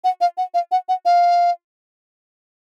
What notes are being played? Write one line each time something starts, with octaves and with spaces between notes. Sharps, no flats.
F#5
F5
F#5
F5
F#5
F#5
F5